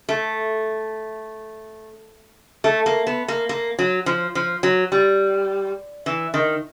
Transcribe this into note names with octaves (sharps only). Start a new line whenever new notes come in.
A3
A3
A#3
B3
A#3
A#3
F#3
F3
F3
F#3
G3
E3
D#3